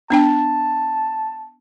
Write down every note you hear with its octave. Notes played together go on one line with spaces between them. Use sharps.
B3 D4 G5 A5